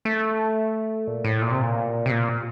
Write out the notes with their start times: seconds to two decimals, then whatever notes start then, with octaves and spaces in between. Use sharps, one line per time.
0.05 A3
1.07 A#2
1.24 A2
1.41 A#2
1.52 C3
1.62 A#2
2.06 C3
2.11 A#2